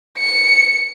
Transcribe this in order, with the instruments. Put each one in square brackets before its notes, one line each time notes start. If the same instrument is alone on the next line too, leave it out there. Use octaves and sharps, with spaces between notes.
[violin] C#7